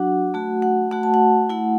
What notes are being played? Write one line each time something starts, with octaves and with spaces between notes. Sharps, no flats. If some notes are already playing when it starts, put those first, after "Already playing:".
Already playing: F#3 D4 F#4 F#5
A3 F#4
F#5
A3 F#4 F#5
A5
F#5
A3 E4 F#5